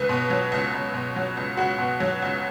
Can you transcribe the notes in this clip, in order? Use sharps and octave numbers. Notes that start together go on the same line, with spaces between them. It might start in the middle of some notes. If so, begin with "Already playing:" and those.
Already playing: C#2 B4
B2
F#3
C#2
C#2
B2
F#3
C#2
C#2 F#4
B2
F#3
C#2